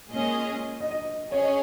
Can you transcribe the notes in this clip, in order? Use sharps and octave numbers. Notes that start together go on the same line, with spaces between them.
A#2 G#3 C#4 G#4 D#5
D#5
D#5
C#4 G#4 C#5
D#5